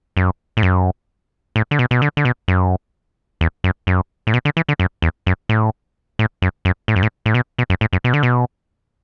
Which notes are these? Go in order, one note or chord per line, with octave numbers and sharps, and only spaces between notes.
F#2
A2
F#2
A2
D3
B2
B2
D3
D3
B2
F#2
E2
F#2
F#2
A2
B2
D3
E3
D3
F#2
E2
F#2
A2
A2
F#2
F#2
A2
F#2
A2
A2
B2
B2
F#2
A2
F#2
B2
D3
B2